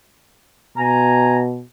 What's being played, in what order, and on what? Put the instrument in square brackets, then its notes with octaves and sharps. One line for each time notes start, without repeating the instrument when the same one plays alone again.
[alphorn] B2 [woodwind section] G#5 A#5